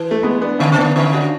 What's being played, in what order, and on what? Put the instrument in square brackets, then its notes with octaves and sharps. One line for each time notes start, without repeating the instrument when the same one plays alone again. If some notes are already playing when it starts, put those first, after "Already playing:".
Already playing: [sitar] E3
[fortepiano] A3
G#3 B3
B3 D4
[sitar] D3 [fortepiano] C#4 E4
[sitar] C#3
[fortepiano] B3 D4
[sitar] D3
[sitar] D3 [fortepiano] C#4 E4
[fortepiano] D4 F#4